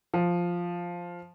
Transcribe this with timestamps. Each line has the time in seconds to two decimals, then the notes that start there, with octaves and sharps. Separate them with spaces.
0.14 F3